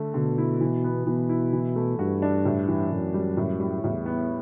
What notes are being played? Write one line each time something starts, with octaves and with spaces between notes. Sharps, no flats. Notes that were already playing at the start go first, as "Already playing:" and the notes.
Already playing: D3 A3
B2 D3
E4
E3
B3
B2 E3
E4
E3
A3
G2 F#4
D4
A2
E3
F#2 A2
G3
A2
G3
E2 A2
B3